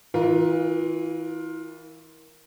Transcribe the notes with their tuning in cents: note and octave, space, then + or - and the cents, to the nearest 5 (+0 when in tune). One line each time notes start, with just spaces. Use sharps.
E3 -25 F4 +15 A#4 +15